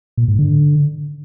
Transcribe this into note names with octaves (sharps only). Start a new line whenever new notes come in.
A#2
G#2
D3